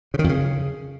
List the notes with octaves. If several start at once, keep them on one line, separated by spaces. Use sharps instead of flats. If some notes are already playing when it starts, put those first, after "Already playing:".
C#3
D#3
F2
C#3